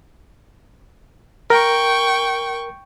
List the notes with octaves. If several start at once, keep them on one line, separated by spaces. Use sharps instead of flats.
A#4 G5 C#6